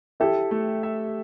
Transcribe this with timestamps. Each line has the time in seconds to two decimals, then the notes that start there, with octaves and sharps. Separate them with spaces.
0.20 E4 G4 A4
0.51 A3
0.83 E5